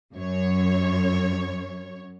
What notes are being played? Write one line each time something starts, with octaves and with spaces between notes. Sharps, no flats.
F#2 C#5